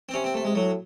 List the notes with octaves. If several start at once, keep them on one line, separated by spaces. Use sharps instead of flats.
C4
C3 C#4
C4
A3
G#3
A2 F#3